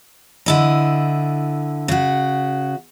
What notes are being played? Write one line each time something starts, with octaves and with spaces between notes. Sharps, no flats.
D3 E4 D#5
C#3 F#4